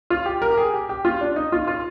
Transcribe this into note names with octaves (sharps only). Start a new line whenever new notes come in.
F4
G4
A#4
G4
G#4
G4
G4
F4
D4
D#4
F4
F4